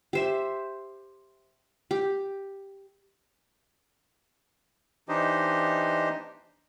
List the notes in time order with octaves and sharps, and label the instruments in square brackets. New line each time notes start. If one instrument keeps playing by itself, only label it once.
[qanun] G4 C5 E5
G4
[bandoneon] E3 D4 D#4 G4 C5 D#5